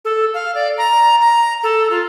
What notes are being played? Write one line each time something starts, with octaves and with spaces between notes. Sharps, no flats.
A4
F5
D5
A#5
A#5
A4
F4